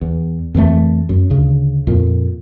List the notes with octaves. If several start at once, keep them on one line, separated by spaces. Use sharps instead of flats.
E2
F2 E3 F#3 A3
F#2
D2 C#3
F2 A#2